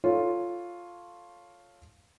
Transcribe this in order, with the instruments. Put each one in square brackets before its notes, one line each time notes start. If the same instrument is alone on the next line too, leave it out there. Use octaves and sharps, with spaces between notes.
[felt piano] F4 A4 C#5